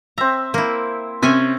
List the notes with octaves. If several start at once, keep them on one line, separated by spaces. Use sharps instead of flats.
C4 E5 A#5
A#3 E4
C3 C#4 E5 G#5